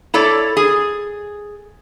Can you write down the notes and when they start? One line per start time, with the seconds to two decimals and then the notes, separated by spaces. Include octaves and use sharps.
0.14 E4 A4 C#5 D5
0.57 G#4